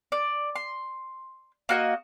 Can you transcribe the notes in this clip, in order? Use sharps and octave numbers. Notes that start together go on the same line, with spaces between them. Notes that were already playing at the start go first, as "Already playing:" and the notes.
D5
C6
A#3 F#4 D#5